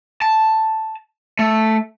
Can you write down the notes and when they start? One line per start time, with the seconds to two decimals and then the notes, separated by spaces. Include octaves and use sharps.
0.22 A5
1.39 A3